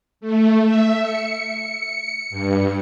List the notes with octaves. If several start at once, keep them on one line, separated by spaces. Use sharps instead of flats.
A3
E5
C#7
G2